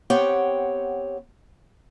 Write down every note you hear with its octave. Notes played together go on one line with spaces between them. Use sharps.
B3 C4 G4 C#5 F#5